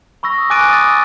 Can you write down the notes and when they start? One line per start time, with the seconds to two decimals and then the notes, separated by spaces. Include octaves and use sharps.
0.23 B5 C#6 E6 A#6
0.38 D#6
0.50 G#5 D6 F#6 A6 D7 D#7
0.69 D#6 E6 A6